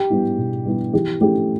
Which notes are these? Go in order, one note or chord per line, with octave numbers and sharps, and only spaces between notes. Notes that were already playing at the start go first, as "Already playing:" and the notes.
Already playing: G4
G3 B3 E4
B2
G3 B3 E4
E3 G4
A3 C#4 E4 G4